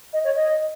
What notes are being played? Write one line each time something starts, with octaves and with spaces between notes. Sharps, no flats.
D#5
C#5
D#5